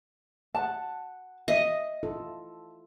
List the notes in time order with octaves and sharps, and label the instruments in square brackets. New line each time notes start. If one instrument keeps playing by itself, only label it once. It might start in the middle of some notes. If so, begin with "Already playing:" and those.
[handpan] F#5 [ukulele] A5
[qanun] D#5 [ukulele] E5
[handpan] E4 F4 A4